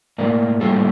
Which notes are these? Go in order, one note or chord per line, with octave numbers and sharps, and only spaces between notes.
A2 G3 A#3 A#4 D5
A2 G3 A#3 F4 A4